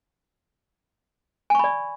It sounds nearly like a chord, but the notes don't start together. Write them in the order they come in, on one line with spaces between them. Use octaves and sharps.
G#5 C#6 B5 D5